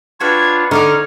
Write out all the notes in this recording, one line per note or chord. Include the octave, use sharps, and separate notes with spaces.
D4 F4 F#4 B4 C#5 G5 G#6
D3 D#4 C#5 D5 D6 F6